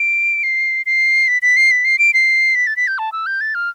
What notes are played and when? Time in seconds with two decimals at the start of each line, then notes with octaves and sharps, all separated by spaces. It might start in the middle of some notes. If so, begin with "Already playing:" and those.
Already playing: D7
0.43 C7
0.86 C7
1.28 B6
1.42 B6
1.57 C7
1.71 B6
1.85 C7
1.99 D7
2.14 C7
2.55 B6
2.67 A6
2.76 B6
2.88 G6
2.98 A5
3.12 E6
3.26 G6
3.41 A6
3.55 F6